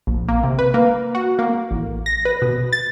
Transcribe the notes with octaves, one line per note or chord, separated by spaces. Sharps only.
A#1
A#3
C3
B4
A#3
F#4
A#3
A1
A#6
B4
B2
A6